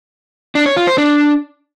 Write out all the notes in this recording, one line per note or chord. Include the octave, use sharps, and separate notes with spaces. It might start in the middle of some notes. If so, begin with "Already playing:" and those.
D4
C#5
F4
C5
D4